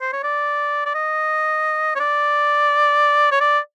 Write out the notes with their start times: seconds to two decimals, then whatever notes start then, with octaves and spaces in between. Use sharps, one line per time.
0.01 C5
0.13 C#5
0.24 D5
0.86 D5
0.95 D#5
1.95 C#5
2.00 D5
3.32 C#5
3.40 D5